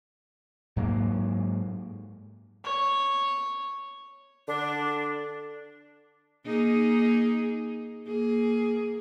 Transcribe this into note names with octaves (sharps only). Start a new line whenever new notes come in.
G#2 F#3 A#3
C#5
D3 D4
A#3 D#4 G#4
A#3 G#4